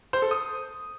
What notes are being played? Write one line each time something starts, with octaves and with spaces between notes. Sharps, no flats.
C5
A4
D#6